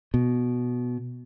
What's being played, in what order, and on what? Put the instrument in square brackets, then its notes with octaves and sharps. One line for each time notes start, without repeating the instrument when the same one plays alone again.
[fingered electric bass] B2